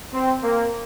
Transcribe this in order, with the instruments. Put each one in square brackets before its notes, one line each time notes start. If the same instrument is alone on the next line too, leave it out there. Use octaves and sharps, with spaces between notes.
[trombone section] C4
A#3